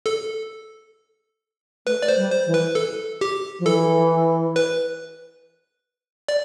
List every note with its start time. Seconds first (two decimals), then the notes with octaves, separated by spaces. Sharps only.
0.06 A4
1.86 A3 B4
2.02 D5
2.08 C5
2.16 G3
2.31 C5
2.46 E3
2.54 B4
2.75 A4
3.21 G4
3.59 F3
3.66 E3 A4
4.56 B4
6.28 D5